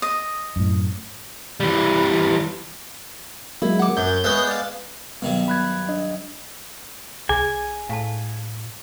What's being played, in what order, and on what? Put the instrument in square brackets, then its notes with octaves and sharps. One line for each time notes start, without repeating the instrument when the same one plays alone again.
[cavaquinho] D#5
[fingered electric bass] F#2 A2
[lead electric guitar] E3 G3
[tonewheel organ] F#3 G#3 A#3 [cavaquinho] E4
[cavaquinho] F#5 D6
[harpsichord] F#2 [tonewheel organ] G6
[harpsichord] G#3 B3 [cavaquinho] C#5 E5
[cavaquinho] D5 F5
[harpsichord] G2 D#3 F#3 [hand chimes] B3
[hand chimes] B5 F#6 G#6
D4 D#5
[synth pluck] C2 [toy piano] G#4 [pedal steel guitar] G#5
[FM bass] A2 [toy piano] F5 A5